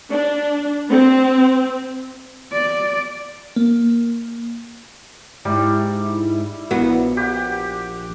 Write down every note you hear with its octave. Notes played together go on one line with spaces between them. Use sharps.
D4
C4
D5
A#3
G#2 G3 E4
A#1 B3 F#4
G4 F#5